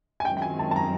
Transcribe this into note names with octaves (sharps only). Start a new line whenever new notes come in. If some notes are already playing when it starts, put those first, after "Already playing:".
G#5
F#2 D#3 G#3 C4 G5
G5
G#5
A5
A5
A#5